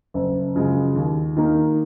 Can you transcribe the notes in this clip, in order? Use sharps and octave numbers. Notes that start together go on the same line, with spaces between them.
F#1
F#2 C#3 F3 G#3
D#2
D#3 A#3 D#4